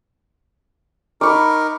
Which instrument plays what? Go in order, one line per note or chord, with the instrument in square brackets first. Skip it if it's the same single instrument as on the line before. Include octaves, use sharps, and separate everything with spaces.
[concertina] D#4 A#4 [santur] B5 C#6 D6